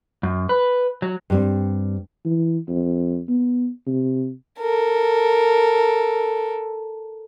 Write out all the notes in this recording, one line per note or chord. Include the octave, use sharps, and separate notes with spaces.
F#2
B4
F#3
G2 G3 C4
E3
F2
B3
C3
A4 A#4